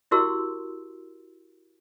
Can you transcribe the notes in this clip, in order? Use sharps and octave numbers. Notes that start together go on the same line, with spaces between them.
E4 F#4 G4 A#4 C6 E6